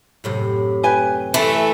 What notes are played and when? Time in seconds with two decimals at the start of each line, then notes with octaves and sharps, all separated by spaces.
0.24 F#2 A2 C3
0.83 G4 B4 G#5
1.34 E3 A3 A4 E5